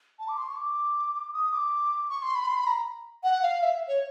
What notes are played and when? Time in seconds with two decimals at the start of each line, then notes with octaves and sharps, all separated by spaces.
0.19 A5
0.28 D6
0.38 C6
0.48 C#6
0.57 D6
1.33 D#6
1.53 D6
2.10 C#6
2.22 C6
2.35 B5
2.48 C6
2.57 B5
2.67 A#5
3.24 F#5
3.43 F5
3.63 E5
3.88 C#5